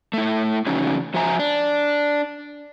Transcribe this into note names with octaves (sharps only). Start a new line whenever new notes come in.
A3 E4
C#3 E3 F#3 A3 C#4 D#4
F3 F#4 C5 E5 G#5 A#5
D4